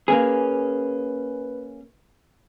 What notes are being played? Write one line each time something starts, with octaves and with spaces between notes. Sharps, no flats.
A#3 C#4 G#4 B4